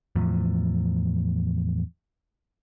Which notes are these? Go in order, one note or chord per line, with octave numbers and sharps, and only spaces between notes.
E2 A2 F3